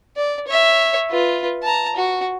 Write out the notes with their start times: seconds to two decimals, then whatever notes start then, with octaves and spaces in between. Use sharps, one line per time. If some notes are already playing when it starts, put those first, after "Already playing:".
0.16 D5
0.47 C#5 E5
1.11 F4 B4
1.63 A5 A#5
1.96 F#4